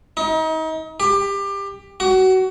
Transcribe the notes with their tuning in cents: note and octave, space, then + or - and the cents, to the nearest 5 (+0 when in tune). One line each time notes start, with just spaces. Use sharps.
D#4 +35
G4 +20
F#4 +25